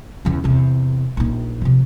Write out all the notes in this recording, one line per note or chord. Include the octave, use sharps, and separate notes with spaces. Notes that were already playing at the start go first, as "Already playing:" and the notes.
E2 C#3
E2 C3
A#1 D#4
C3 F3